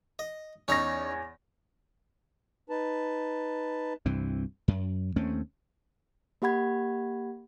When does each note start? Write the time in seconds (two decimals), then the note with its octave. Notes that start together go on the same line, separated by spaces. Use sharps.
0.19 D#5
0.68 E2 C#4 D#4 C#5 A#5 A#6
2.70 D#4 B4 A5
4.06 C2 G2 E3 C4
4.68 F#2
5.16 D#2 A3 C4 C#4
6.42 A#3 G4 F#5 B5 G#6